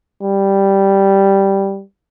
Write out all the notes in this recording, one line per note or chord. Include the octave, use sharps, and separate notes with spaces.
G3